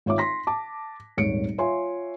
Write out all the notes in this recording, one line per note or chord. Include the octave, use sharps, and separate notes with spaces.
G#1 F4 C#5 E5 D6
C6 A#6 B6
A5 D6
D#1 G#1 C#5 C#7 D7
F4 C#5 E5 G#5 C6